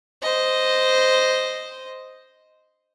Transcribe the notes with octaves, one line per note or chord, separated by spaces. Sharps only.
C5 D#5